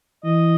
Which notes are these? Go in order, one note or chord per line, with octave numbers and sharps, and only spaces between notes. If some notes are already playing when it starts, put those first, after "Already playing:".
E3 D#5